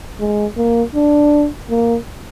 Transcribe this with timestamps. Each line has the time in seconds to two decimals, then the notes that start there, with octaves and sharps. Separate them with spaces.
0.20 G#3
0.57 A#3
0.95 D4
1.70 A#3